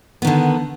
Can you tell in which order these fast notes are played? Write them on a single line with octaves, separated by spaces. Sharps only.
B3 D#3 D3